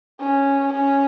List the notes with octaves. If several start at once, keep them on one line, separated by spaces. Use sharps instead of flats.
C#4
C#4